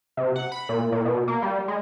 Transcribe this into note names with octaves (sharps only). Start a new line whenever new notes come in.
C3
F#5
B5
A#2
A#2
B2
A#3
G3
G#3